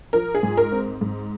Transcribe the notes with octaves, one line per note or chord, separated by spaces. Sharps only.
F3 A#4
G#4
G#2
A#4
C4
G#2